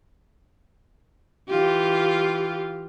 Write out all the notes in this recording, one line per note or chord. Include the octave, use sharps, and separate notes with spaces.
E3 F4 G4